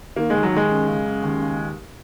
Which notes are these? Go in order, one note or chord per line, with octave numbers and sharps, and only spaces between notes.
D#3 A#3
D#2 G#3
F#3
D#2 G#3
F#2
C#3
F#2
D#2
C#3